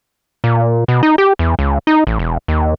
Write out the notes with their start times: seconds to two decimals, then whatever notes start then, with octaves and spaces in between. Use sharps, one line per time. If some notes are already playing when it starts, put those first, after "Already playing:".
0.44 A#2
0.88 B2
1.03 D#4
1.18 G4
1.39 E2
1.59 C#2
1.87 D#4
2.07 A1
2.19 E1
2.48 D#2